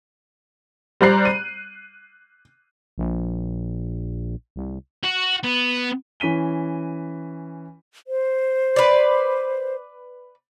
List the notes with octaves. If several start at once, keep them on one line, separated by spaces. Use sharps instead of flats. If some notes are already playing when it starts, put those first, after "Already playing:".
G3 C5 D5 A#5 F#6 C7
D#7
A#1
C2
F#4
B3
E3 C#4 B6 D#7 G7
C5
B4 D5